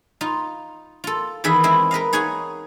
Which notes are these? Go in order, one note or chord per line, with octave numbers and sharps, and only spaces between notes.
D#4 F4
F4 A4
E2 D#3 G#4 B4 E5
G#3 C4 E4
A#4 B4 D#5 F5
D#4 G#4 C#5 F#5 G#5